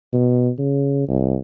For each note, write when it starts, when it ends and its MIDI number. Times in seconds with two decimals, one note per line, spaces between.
0.13 0.50 47
0.59 1.06 49
1.08 1.36 36